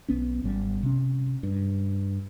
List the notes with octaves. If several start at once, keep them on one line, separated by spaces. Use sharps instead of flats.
B1 B3 C#4
G#1 G3
C3 C#4
G2